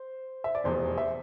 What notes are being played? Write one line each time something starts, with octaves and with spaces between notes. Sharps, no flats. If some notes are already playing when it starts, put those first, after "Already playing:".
Already playing: C5
E5
D5
F1 E2 B2 C5
E5